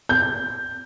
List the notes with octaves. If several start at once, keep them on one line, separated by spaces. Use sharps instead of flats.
G6